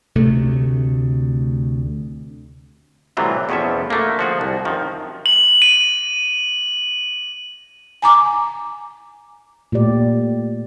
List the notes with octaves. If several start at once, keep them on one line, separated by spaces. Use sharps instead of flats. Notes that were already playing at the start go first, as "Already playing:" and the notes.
D2 C3 A3
A2 C3 E3 F#3 G3 F4
E2 B2 F3 C#4 A4 E5
D3 A3 A#3
F3 F#4 G#4
C2
F#2 D#3 F3
F#7
D#7
G#5 A#5 D6
A#2 A3 G4 D5